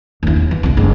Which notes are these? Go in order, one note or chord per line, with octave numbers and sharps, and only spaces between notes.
D#2 E4
D#2
E3
C2 F4
F#1 G#2